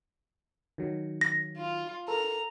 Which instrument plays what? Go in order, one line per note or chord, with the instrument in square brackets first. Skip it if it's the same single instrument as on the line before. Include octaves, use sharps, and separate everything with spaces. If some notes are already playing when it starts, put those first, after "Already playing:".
[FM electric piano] D#3 F#3
[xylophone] A#6
[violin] F4
[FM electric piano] A4 A#4 [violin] A#5